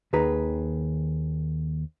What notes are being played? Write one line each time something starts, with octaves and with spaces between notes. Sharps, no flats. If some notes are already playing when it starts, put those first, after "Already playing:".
D#2 D#3 G#4 B4 A#5